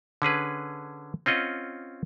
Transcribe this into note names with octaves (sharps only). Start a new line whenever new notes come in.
D3 C#4 G#4 B4
C4 C#4 F4 D#5 F#5